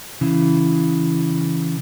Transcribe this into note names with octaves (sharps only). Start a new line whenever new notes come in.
C#3 E3